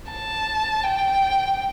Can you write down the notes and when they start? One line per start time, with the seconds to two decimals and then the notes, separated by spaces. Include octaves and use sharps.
0.10 A5
0.84 G5